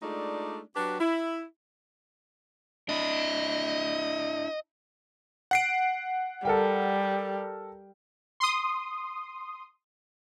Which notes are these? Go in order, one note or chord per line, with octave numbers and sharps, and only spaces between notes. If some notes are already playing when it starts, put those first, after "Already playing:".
G#3 A3 D4 D#4 F4 D5
F#3 D4 F#4 G4 B4
E4
D4 E4 D#5
F#5 C7 D7
G3 A4 A#4 G5
C6 D#6